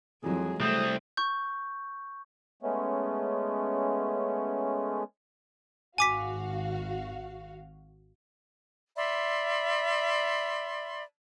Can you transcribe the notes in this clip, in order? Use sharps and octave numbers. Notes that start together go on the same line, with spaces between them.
F2 E3 F#3 G#3 G#4
C2 A3 C4 D#6
C#6 G6
G#3 A3 B3 C#4
G#1 F#4 F5 G#5 D6 B6
D5 E5 B5 C6